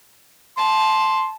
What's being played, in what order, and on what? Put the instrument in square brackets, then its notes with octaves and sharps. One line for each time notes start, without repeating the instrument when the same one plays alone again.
[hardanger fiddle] A5 [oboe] C6